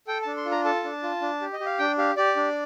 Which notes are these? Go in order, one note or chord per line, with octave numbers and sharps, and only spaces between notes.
A4 G5
D4 A5
C6
F4
A#5
A4 A5
D4
F4
D4
G4
D#5
G4
F5
D4 G5
G4 F5
G4 D5
D4